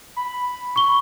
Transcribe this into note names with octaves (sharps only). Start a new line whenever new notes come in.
B5
C#6 G7